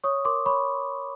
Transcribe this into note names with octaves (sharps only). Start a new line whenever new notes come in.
C#5 C#6 D#6
A#4 C6 D6
C#5 B5 C#6